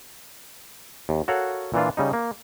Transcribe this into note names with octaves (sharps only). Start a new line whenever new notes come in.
D#2
F#4 A4 A#4 C#5 F5 F#5
A#2 E3 D4 F4
C#3 G3 D#4
A#3